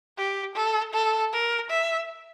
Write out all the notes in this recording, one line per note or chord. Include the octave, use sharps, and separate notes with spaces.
G4
A4
A4
A#4
E5